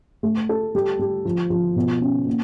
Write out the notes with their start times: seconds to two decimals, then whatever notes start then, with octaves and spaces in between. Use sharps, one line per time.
0.23 A3
0.49 A4
0.75 G3
0.99 G3
1.25 F3
1.50 F3
1.76 B2
2.01 C#4
2.26 A#3